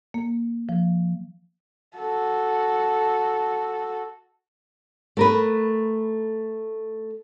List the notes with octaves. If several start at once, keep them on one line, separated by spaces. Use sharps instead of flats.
A#3
F3
F#4 A4
A3 A#4 B4